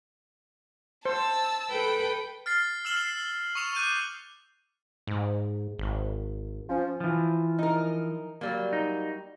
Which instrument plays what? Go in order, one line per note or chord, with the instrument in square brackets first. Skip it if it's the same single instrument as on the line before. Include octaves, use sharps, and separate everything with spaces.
[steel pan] C5 [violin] A5 E6
[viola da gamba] A4 B4 [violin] G5
[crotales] F6 A6 C7
E6 F6 E7 F#7 G7
C7
C#6 D#6 C#7 E7 F7
D6 F#6 G6 D#7
[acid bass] G#2
G#1
[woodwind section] F3 C#4
[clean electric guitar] E3 F3
[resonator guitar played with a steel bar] D#4 A#4
F#3 G3 A#3
[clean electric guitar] D#4